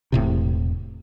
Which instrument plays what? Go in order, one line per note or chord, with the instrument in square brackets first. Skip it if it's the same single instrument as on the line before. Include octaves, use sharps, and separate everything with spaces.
[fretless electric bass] E1 A2 C3